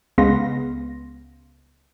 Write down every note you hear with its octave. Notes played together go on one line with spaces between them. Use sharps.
C#2 G#3 B3 F5 C6 A#6